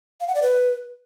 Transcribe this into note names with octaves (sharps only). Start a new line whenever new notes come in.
F5
F#5
D5
B4